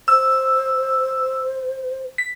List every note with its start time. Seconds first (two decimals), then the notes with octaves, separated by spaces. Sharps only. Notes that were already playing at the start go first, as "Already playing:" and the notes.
0.08 C5 E6
2.18 B6